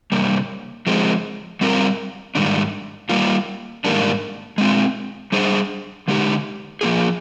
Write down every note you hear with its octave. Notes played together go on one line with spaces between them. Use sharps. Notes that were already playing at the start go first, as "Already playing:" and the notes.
C3 G3 A#3
F3 G#3 C4
G3 C4 F4 A#4
G#2 D#3 G3 D4
G3 A#3 F4
G#2 D#3 G3 A#3 D4
G#3 C4 F4
G3 D4 G#4 C5
D3 G#3 D#4 G4
F3 A#3 F4 G#4